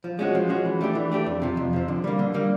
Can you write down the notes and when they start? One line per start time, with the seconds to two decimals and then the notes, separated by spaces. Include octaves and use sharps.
0.04 F3
0.19 G#3 C#4 F#4
0.35 F3
0.49 G#3 C#4 F#4
0.65 E3
0.81 A3 D4 G4
0.95 E3
1.11 A3 D4 G4
1.26 F2
1.42 C3 F3
1.57 F2
1.73 C3 F3
1.88 D3
2.04 G3 A#3
2.19 D3
2.34 G3 A#3